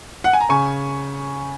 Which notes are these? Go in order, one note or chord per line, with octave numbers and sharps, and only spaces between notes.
F#5
G#5
A#5
C#3 G#5 C#6